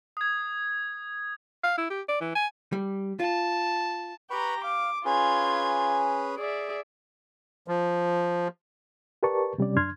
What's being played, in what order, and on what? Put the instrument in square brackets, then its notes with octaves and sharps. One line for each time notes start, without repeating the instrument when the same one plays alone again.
[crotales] D#6 G#6
[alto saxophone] F5
E4
G4
D5
E3
G#5
[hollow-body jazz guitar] G3
[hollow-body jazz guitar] F4 [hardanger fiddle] A5
[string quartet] G4 A#5 [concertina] B4 B5 C#6
[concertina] F5 [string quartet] D6
[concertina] C#4 G#4 B4 [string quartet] F4 G#6
[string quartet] G#4 D5 E5
[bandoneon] F3
[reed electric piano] G4 A#4 B4 D5 A5 C#6
C3 G3 C#4 D5
F#2 D4 C6 F6 G#6